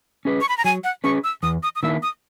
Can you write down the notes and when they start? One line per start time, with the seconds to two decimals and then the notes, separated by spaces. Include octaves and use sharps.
0.25 C#4 G#4 B4
0.41 C#6
0.49 B5
0.58 A#5
0.64 F#3 G#5
0.84 F#5
1.04 C#4 G#4 B4 C#6
1.24 E6
1.43 E2 D#6
1.63 D#6
1.76 D#6
1.83 D#3 A#3 E4 E6
2.03 D#6